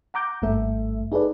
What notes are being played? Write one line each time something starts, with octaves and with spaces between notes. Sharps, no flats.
F#5 A#5 D6 G6
G#1 G2 A3 A4 E5
D#4 G#4 A4 B4 D5